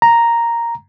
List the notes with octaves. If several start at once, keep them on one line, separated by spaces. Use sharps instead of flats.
A#5